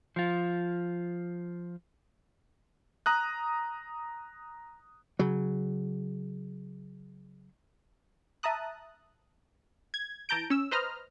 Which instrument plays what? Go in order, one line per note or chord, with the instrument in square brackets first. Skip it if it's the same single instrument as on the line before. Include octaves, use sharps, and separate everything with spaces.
[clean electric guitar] F3 F4
[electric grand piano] A#5 D#6 F#6
[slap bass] C#3 F#3
[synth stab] E5 A5 A#5 D#6 F#6
G#6
E3 A5 A#5 G6 D7
C#4 E6
B4 C5 D#5 A#5 F6